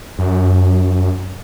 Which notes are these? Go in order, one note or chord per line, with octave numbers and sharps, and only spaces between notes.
F#2